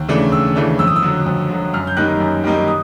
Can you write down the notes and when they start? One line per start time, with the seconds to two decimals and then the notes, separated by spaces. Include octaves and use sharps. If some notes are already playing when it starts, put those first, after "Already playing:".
Already playing: D#2
0.08 C#3 E3 A3 D4
0.32 D#2 E6
0.56 C#3 E3 A3 D4
0.79 F2 E6
0.87 D#6
0.96 E6
1.02 D3 F#3
1.26 F2
1.50 D3 F#3
1.74 F#2 F6
1.87 G6
1.97 D#3 G3 A#3 D#4 F#6
2.20 F#2
2.44 D#3 G3 A#3 D#4
2.68 D#6